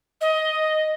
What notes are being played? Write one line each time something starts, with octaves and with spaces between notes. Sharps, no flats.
D#5